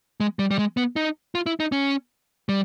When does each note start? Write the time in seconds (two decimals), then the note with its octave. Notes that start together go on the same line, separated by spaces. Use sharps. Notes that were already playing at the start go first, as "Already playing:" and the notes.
0.20 G#3
0.39 G3
0.51 G3
0.59 G#3
0.77 B3
0.96 D#4
1.35 F4
1.46 E4
1.60 D#4
1.72 C#4
2.49 G3